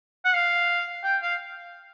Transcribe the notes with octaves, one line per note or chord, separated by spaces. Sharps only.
F#5
F5
G5
F5